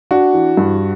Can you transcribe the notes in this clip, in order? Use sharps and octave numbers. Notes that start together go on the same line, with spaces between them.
D4 F#4
E3
G2